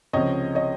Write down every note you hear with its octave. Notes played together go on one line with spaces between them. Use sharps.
C#2 C3 F3 C#5 D#5
C#5 D#5